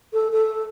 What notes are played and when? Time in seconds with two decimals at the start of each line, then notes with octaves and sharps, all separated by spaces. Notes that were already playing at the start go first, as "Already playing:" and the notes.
0.13 A4
0.32 A4